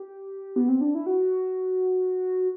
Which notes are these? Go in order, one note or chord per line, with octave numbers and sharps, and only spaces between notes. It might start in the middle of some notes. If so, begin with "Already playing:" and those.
Already playing: G4
B3
C4
D4
E4
F#4